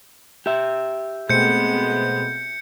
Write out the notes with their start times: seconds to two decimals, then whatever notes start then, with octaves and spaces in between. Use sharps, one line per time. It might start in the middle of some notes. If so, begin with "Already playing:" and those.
0.46 G4 E5
1.29 B2 G#3 A3 B3 C4 G6 C#7